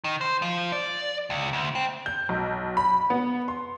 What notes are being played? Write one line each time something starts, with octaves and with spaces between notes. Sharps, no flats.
D#3
C5
F3
D5
C#2
D2
C4
G6
B1
B5
B3
C6